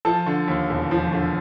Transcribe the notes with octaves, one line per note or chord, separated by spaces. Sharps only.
F3 A4 A5
D3
D#2
E1
F3
D3